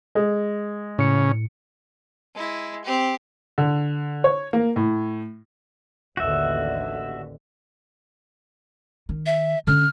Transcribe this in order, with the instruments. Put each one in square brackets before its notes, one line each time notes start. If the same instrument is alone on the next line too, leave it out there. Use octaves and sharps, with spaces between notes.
[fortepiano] G#3
[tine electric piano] A2 C#7 [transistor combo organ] C#3
[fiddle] G#3 E4
C4 G4
[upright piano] D3
C#5
A#3
A2
[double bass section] A1 D#2 D3 [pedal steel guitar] F#4 E5
[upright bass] D#3
[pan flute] E5
[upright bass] D3 C#4 [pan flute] F6